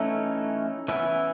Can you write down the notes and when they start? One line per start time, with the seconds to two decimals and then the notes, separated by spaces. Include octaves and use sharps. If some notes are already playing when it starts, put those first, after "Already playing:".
Already playing: E3 A3 C#4 D#4
0.88 E3 B3 C#4 E4